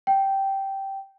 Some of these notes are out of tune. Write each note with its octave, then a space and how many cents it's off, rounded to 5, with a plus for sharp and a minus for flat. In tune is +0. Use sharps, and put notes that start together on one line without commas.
G5 -10